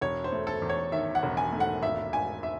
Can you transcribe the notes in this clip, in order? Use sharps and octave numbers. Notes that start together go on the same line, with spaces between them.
E1 C#5
C5
A3
A4
E2
C#5
D#3 E5
F#5
E1
G#5
A3
F#5
G#1 E5
G#1 G#5
E5